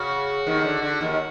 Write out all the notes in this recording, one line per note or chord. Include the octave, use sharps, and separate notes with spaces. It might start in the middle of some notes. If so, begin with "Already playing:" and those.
Already playing: C#3 F#4
D#2 D#3
D3
D3
D#2 D#3